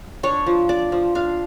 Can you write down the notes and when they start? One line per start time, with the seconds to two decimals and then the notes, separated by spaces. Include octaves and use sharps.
0.23 D4 C#5
0.46 F3
0.69 D4 D5
0.92 F3
1.15 D4 F5